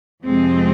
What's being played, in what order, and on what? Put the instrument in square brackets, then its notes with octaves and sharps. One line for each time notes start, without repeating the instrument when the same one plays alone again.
[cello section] F2 C3 F3 G#3 C4